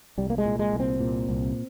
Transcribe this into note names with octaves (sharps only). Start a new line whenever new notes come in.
C2 G3
A#3
G#3
A#2
G#3
C2
C4
A#2
C2